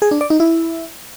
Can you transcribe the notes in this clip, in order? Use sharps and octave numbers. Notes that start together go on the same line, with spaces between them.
G#4
D4
D5
D#4
E4